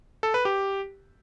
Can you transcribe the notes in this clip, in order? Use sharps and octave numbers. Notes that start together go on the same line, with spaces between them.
A4
B4
G4